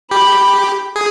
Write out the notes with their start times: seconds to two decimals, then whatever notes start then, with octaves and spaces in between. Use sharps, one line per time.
0.11 G4 B5
0.96 G#4